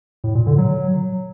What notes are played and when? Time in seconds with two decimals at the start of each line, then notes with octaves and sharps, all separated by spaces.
0.24 A2
0.35 A#2
0.47 D3
0.58 F#3